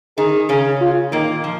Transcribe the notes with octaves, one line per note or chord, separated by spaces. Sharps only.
D#3 D#4 G#4
C#3 C#4 G#4
F4
A#2 D#3 A#3
F3